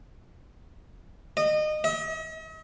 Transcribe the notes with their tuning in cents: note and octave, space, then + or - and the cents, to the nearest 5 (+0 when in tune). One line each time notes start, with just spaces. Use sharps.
D#5 -25
D#5 +45